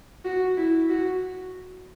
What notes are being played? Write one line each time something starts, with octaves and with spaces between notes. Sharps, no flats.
F#4
E4
F#4